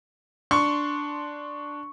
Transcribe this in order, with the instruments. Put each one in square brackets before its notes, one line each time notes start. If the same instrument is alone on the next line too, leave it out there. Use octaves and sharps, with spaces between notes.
[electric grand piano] D4 C6 [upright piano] C#6